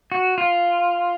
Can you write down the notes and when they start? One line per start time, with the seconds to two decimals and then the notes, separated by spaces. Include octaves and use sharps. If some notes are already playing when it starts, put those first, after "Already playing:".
0.12 F#4
0.38 F4